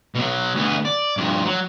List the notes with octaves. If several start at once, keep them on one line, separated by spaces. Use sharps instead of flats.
B2 F#3
D2 B3
D5
G2 F3
F#3